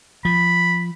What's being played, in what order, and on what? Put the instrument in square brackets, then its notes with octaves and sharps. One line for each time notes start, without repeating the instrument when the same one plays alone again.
[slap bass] F3 [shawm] B5